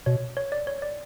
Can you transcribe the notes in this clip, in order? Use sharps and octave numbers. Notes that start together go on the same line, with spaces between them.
B2 C#5
C#5
D5
C#5
D5